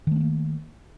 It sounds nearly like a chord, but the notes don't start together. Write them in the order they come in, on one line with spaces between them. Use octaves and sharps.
D#3 A3 C4 A#3